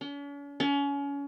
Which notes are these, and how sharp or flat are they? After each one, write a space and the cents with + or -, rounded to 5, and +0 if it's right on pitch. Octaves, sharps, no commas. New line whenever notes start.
C#4 +45
C#4 +30